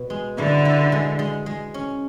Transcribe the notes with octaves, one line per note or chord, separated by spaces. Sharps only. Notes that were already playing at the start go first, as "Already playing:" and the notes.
Already playing: B2
G#3
D3 E4
E4
G#3
G#3
G#3
C#4